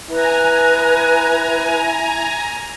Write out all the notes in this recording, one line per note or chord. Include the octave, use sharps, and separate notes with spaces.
E4 B4 G#5 A#5